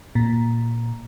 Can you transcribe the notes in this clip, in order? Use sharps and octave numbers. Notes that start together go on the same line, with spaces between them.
A#2